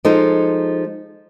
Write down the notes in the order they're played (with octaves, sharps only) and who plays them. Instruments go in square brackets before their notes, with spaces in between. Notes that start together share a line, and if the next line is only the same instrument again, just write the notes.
[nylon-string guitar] F3 G#3 D#4 A4